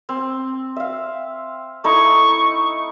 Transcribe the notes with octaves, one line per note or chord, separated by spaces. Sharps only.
C4
E5 F5
A3 D#4 E4 C#6